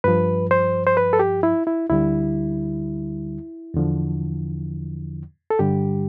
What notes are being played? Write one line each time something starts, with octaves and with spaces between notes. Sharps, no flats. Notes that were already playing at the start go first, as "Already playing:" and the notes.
G2 F3 B4
C5
C5
B4
A4
G4
E4
E4
D2 D3 G3 E4
E2 D3 F3
A4
G2 D3 G3 G4